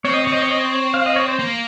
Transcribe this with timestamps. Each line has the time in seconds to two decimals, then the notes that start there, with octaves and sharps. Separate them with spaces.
0.05 C4 C#5
0.14 D#5
0.24 C#5
0.27 C4 D#5
0.42 C#5
0.51 D#5
0.61 C#5
0.94 F5
1.06 D#5
1.16 C#5
1.28 C5
1.39 A#3